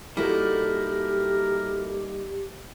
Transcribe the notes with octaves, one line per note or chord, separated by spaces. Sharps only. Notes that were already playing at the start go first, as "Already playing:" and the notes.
G3 A#3 D#4 E4 F#4 G4 A4 A#4